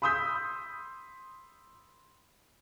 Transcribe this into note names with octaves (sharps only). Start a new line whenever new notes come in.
B5 C6 D#6 E6 G6 B6